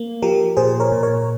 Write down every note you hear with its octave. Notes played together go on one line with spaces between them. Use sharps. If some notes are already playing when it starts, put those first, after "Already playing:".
Already playing: A#3
F3 G4 A#4
A#2 G#4 C5
A#4 C#5
A#2
A#4 C#5